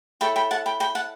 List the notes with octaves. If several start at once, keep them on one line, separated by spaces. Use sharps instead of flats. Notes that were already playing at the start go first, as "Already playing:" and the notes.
E4 A4 C#5 G5 B5
G5 B5
F#5 A5
G5 B5
G5 B5
F#5 A5